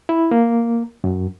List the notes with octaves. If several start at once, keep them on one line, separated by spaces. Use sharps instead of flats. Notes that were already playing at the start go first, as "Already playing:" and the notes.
E4
A#3
F#2